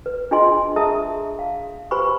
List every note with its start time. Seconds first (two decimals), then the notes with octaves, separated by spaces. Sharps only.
0.06 B4
0.31 D4 F4 G#4 D#5 G#5 C6
0.76 G#4 E5 A5 A#5 D#6
1.39 F5
1.91 G4 B4 C5 G#5 B5 C#6